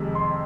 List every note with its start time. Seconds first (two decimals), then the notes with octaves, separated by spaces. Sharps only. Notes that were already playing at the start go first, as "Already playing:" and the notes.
Already playing: F2 C3 D#3 G#3
0.15 C6